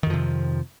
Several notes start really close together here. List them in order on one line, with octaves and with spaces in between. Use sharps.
D#3 F2 F3 C3